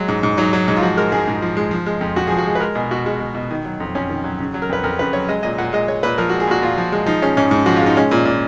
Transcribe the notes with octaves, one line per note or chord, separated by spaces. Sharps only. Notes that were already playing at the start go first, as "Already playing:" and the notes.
Already playing: F#3 G#3
G#2
G#2
F#3 D#4
F#3
G#2
F4
F3 F#4
G#3 A#4
G#2 G#4
G#2
F3
G#3
F3
G#3
F2
F2 F#4
F3 G#4
F#4
G#3 G#4
B4
G#3 A#4
B2 G#4
B2 F#4
G#3 F#4
G#3
B2
D#3
F#3
F2
F2 C#4
D#3
F#3
C#3
F#3
A#4
F2 B4
F2 A#4
C#3 B4
F#3 C#5
G#3 D#5
A#2 D#5
A#2 F#5
G#3 D#5
G#3 C#5
A#2 B4
F3 A#4
G#3 F#4
G#4
A#2 F#4
A#2 F4
F3
G#3
F3 D#4
G#3 C#4
G#2 C#4
G#2
F3 F#4
F4
G#3 D#4
G#3 C#4
A#2
A#2